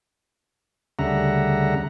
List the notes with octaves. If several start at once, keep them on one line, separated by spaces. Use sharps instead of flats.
D2 C#3 G3 E5 F#5 A#5